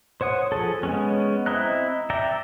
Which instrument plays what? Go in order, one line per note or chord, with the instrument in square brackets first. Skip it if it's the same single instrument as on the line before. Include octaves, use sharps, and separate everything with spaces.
[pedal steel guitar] C5 C#5 F#5 D#6
F3 G#4 A4
G#3 B3 C#4
C4 E4 D#5 A#5 F#6
D5 E5 G5 A#5